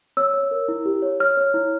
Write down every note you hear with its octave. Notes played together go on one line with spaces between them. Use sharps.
C#5 E6
C#5
A#4
E4
G4
C#5
C#5 F6
C#5
E4